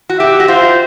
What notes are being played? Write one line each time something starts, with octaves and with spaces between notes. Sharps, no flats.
F#4
G4 E5
F#4
F4 C5